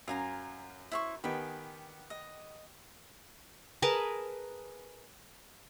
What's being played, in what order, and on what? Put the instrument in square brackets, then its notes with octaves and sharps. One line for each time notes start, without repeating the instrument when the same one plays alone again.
[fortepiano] F#2 [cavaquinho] F5 G#5 A#5
[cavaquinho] E4 C5 C#6
[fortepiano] D#3 B3 G4 [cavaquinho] G5 G#5 B5
[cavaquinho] D#5
[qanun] G#4 A#4 B4 A5